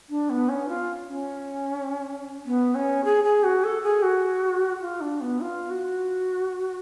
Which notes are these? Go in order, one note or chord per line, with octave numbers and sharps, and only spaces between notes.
D4
B3
C#4
F4
C#4
B3
C#4
G#4
G#4
F#4
A4
G#4
F#4
F4
D4
B3
F4
F#4